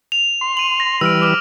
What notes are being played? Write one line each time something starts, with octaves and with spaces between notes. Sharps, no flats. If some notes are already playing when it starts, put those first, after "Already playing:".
F7
C6
D#7 F#7
A#6
E3 G3 B4 E6 F6 D7
D6 F6